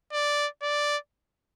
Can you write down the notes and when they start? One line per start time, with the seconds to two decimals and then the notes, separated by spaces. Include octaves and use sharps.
0.13 D5
0.62 D5